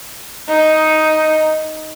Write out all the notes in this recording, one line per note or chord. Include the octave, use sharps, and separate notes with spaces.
D#4